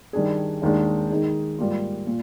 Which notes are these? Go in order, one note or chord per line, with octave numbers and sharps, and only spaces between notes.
D#3 G3 D4 G#4
D#2 D#3 G#3 D4
D#3 G#3 D#4 G#4
G#2 G3 A#3 F4
A#2